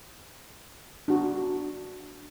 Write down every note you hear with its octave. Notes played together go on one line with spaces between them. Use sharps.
D4 F#4